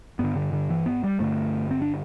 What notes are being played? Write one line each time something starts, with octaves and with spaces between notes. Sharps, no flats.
G2 D3 B3
D3
D3
E3
B3
G3
G2 D3 A3
C4
D4